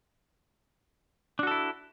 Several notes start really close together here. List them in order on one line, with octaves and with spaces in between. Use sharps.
D4 F#4 A4 E4